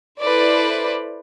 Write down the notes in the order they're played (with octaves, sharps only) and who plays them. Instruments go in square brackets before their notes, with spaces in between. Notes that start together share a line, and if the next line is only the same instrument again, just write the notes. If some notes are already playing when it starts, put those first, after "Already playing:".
[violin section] E4 A4 B4 C5 D5